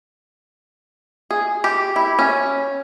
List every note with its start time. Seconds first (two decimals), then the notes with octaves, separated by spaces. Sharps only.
1.31 G#4
1.64 G4
1.96 E4
2.19 C#4